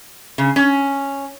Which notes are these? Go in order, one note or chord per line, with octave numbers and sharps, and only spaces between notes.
C#3
C#4